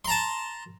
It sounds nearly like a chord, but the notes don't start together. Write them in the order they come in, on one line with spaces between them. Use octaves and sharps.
C6 A#5 A5